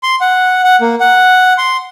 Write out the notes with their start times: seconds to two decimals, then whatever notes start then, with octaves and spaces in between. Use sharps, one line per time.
0.03 C6
0.21 F#5
0.64 F#5
0.81 A#3
1.00 F#5
1.58 C6